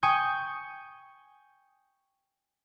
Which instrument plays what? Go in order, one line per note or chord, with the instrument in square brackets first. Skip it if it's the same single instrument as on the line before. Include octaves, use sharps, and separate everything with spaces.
[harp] G5 G#5 C#6 D#6 G6